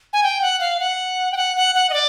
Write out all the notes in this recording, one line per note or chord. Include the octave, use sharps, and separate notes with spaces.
G#5
G5
F#5
F5
F#5
G5
F#5
F#5
F#5
D#5
D5